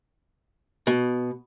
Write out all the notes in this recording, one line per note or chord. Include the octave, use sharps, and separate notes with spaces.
B2